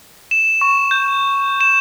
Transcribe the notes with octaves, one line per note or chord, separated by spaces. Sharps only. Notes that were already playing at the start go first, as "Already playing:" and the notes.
E7
C#6
G6
E7